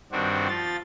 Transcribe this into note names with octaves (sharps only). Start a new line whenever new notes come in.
G2 D#3 C4 D4 F#4
F3 F4 A6